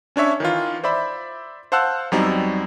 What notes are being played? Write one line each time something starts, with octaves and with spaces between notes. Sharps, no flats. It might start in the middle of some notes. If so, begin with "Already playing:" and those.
C#4 D4 C#5 E5 C#6
D#3 E3 F4
C5 D5 E5 B5
C5 F5 F#5 A5 E6 F#6
E2 F#3 G3 C4 D#4